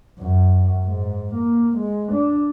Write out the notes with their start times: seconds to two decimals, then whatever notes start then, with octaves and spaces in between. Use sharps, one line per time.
0.19 F#2
0.84 G#2
1.35 A#3
1.77 G#3
2.12 D4